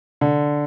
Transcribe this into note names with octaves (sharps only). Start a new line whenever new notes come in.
D3